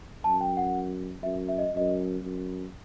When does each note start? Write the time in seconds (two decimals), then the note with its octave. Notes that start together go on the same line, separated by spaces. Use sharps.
0.24 F#2 A5
0.41 G5
0.57 F#5
1.23 F#2 E5
1.49 E5
1.58 D#5
1.73 F#2 D#5
2.23 F#2